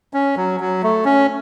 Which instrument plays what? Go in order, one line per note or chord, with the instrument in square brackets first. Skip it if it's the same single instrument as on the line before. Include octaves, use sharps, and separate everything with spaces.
[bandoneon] C#4
F#3
F#3
A3
C#4